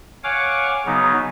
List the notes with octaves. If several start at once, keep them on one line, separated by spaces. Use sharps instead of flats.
C#5 F5 F#5 G#5 D6
C#3 F#3 B3 D#4